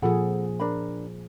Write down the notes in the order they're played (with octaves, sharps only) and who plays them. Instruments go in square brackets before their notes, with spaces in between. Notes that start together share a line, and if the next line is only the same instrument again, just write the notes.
[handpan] A#2 F3 G#4 [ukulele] A4 F#5 B5
[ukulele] D4 A#4 B5